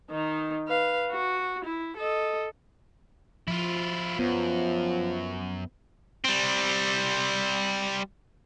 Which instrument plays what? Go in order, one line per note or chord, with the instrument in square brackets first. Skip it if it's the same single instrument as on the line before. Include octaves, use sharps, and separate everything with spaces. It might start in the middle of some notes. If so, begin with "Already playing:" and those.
[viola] D#3 D#4
B4 F5
F#4
E4
A4 D#5
[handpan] F3 [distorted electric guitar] E4 F4
[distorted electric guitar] F#2 [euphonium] F3 [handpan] B3
[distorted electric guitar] G3 C4